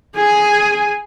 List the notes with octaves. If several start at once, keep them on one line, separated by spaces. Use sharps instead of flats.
G#4 G#5